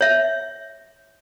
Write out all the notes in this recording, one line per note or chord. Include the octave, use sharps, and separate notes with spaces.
C#5 E5